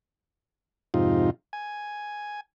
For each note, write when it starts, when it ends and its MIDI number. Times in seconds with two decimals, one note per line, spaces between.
0.94 1.30 41
0.94 1.30 44
0.94 1.30 48
0.94 1.30 63
0.94 1.30 65
1.53 2.40 80